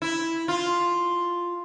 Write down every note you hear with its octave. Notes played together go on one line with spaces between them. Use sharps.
E4
F4